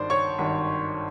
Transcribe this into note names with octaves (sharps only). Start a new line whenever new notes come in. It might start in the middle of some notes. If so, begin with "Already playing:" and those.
Already playing: G#1 G2 D#3 C5 D5
C#5 C#6
G#1 G2 D#3